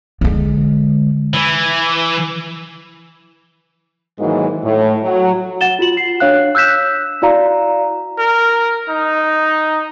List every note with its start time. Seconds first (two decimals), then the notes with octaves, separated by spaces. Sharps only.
0.21 D3 G#3
1.34 E3
4.19 G#2 D#3 E3 F#3 G#3 A#3
4.64 A2
5.03 F#3
5.61 F#5 A6 E7 G7
5.79 F4 F#4 F#7
5.97 C7
6.20 D4 C#5 F5 F#6
6.55 E6 F#6 G6 B6 E7
7.22 E4 F#4 D5 F5 A#5
8.19 A#4
8.89 D#4